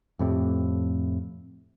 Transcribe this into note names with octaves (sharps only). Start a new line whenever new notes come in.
F2 A2 C3